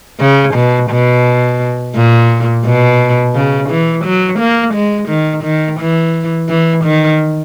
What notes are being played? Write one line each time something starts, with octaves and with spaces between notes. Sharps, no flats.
C#3
B2
B2
A#2
B2
C#3
E3
F#3
A#3
G#3
D#3
D#3
E3
E3
D#3